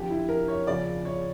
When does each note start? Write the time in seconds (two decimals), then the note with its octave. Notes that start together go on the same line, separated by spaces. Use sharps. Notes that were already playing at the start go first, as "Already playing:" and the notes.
Already playing: F2 D3 F3 G4
0.10 E4
0.29 A#4
0.48 C#5
0.67 E2 C#3 F3 D5
1.05 C#5